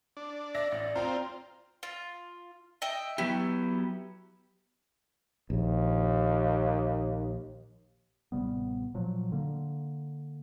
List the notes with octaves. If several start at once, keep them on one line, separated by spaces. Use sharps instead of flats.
D4
D5 E5 A#6
A1
C4 F4 G5 A#5
F4
D#5 E5 G5
F#3 B3 E4 G4
A#1 D#2
A1 C3 G3 B3
A#2 F3 F#3
D3 A#3